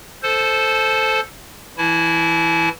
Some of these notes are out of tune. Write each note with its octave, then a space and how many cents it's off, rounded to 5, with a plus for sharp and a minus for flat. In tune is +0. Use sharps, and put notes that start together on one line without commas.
A4 +0 C5 +0 A5 -25
E3 +0 E4 +0 A5 -45